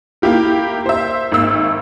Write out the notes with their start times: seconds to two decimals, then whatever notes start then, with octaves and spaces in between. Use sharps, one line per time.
0.22 A#3 E4 G4 A#4
0.86 C5 E5
1.32 G#1 A#3 E6